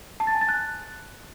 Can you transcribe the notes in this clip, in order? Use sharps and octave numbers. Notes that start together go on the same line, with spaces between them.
A5
A6
G#5
A6
F#6